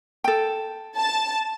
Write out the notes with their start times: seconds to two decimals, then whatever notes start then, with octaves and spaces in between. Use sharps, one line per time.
0.24 A4 G5
0.98 A5